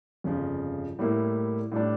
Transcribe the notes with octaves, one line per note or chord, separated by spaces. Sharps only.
G1 F2 C#3 F3
A2 G3 A#3 E4
A2 G3 D4